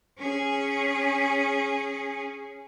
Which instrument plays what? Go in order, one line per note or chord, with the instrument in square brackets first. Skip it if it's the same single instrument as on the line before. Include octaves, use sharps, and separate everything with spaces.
[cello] C#4 G#4